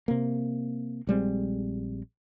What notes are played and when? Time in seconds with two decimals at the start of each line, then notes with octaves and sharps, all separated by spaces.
0.08 C3 A#3
1.07 A#1 G3 G#3 C4